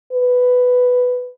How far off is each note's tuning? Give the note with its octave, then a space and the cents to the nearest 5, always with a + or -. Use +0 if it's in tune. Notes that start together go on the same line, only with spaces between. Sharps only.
B4 +5